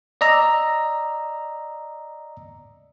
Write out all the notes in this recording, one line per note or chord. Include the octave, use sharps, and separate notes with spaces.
D5 D#5 A#5 E6